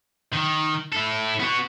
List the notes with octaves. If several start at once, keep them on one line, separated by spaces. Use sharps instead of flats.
D#3
E4 A4
B3 F#4